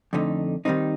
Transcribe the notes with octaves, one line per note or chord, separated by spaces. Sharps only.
F2 D3 A3 D#4
D#3 G3 C4 D#4